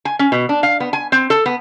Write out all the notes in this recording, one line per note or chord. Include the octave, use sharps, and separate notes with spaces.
G#5
C#4
B2
D4
F5
B3
G#5
C4
A4
B3